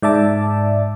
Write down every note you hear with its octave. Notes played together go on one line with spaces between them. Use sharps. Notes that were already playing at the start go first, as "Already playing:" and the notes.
G#2 D5 E5 A5 D6